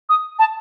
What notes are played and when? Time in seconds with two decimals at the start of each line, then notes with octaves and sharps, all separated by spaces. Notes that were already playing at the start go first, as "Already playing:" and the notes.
0.09 D#6
0.39 A5